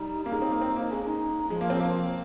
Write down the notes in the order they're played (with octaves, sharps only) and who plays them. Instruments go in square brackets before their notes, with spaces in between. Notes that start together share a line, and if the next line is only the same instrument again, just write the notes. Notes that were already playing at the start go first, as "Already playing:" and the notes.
Already playing: [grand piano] G3 [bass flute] D#4
[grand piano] A#3 [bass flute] C#4
[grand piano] G#3 [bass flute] D#4
[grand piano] C4
A#3
C4
A#3
[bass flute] D#4
[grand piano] G#3 [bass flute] C#4
[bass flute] D#4
[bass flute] F3 [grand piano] G#3
[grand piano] A#3
C4
A#3